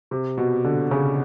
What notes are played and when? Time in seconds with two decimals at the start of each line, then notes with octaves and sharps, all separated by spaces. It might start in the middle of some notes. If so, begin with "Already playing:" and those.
0.11 C3
0.38 B2
0.64 D3
0.91 C#3